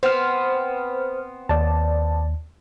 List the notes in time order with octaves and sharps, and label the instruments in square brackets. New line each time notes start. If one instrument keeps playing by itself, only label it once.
[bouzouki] B3 C4 [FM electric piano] C5 F6
[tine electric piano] D#2 [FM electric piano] D5 A5